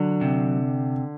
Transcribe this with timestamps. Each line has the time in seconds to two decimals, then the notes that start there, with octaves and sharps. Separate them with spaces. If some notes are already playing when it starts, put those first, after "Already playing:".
Already playing: D3 F#3
0.21 C3